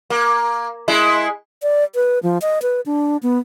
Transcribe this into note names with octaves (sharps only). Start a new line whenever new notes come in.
A#3
G#3 E4
D5
B4
F3
D#5
B4
D4
B3